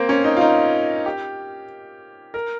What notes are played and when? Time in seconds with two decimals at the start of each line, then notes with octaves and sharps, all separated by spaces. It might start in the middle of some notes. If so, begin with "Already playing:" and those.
Already playing: A#3 C4
0.09 C#4
0.24 D#4
0.37 F4
0.41 D#4
1.06 G4
2.34 A#4